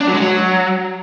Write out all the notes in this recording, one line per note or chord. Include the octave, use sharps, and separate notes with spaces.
D4
F#3
G#3
F#3